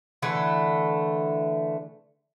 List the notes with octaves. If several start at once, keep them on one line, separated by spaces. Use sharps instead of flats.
D3 E3 A3